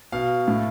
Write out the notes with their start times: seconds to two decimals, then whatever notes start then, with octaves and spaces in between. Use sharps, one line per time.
0.12 B2 F5
0.48 A2